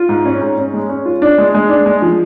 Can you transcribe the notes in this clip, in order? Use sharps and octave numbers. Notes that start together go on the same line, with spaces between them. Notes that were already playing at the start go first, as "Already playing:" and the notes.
Already playing: F4
G#2
C#4
G#2
C#4
G#3
C#4
F4
D4
G#3
G#3
D4
G#3
F3